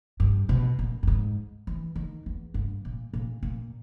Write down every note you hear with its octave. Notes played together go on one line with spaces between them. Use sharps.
G2
B2
A#2
G2
G#2
E3
D#3
E2
G2
A#2
A#2
A#2